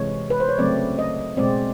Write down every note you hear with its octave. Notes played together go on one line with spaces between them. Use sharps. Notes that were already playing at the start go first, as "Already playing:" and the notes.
Already playing: C3 E3 G#3 C#5
B4
C5
C#5
C#3 F#3 A3 C4 D5
D#5
B2 G#3 C4 D5